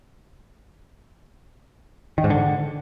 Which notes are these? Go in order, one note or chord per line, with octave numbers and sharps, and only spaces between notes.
D#3
G#2
D3